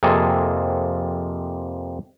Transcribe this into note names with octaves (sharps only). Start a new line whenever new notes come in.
F2 C3 A#3 G#4 A4